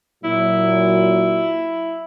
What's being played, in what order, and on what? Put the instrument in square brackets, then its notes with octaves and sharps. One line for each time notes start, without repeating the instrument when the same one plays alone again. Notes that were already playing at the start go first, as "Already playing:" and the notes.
[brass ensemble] A#2 F#3 [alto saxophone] E4